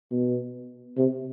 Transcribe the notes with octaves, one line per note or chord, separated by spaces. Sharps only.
B2
C3